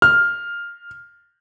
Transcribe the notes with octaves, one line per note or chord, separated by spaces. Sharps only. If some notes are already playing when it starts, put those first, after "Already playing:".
F6